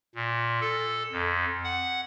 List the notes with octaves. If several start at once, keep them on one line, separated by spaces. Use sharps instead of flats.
A#2
A4
F2
F#5